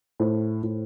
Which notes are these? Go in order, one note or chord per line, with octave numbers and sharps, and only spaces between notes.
A2 C5
A2